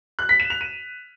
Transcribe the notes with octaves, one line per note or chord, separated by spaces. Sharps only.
F#6
B6
E7
F7
D#7